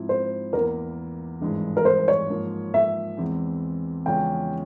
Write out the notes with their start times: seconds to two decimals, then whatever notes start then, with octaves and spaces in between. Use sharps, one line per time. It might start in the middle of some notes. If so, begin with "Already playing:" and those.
Already playing: G#2 F3 C4 E4
0.09 C5
0.53 E2 E3 A#3 A#4
1.41 G#1 G2 E3 G#3
1.77 A#4
1.85 C5
2.08 C#5
2.30 G#2 F3 A#3
2.74 E5
3.17 E2 E3 G#3 C4
4.06 E2 C#3 F3 G#3 C#4 G5